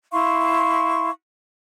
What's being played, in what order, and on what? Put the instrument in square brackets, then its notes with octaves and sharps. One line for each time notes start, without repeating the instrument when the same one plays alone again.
[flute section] E4 F5 C6 C#6